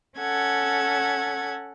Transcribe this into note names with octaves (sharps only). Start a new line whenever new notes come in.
C#4 A4 F#5 G#6